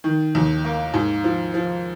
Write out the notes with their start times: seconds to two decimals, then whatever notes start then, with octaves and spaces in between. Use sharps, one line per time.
0.04 D#3
0.35 D#2
0.65 A#3
0.94 G#2
1.24 F3
1.54 F3